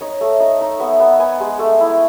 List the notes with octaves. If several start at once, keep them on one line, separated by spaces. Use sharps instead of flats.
D#4 C#5
A3
D#4 D#5
D#4
B3 E5
B3
B3 G#5
G#3
A3
E4